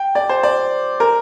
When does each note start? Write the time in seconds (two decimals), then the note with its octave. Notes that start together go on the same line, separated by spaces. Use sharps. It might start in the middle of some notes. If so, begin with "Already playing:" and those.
Already playing: G5
0.15 D5
0.29 C5
0.43 D5
1.00 A#4